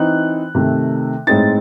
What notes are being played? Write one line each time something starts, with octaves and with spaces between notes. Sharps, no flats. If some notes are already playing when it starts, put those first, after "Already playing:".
Already playing: E3 C4 D#4 F#6
C3 D#3 A3
A2 G#3 C4 D#4 A6